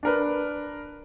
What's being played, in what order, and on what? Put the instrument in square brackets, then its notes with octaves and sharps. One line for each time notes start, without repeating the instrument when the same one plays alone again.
[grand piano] D4 A#4 B4